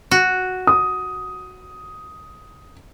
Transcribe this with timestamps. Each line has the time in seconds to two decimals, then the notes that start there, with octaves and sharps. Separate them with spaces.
0.11 F#4
0.67 D#6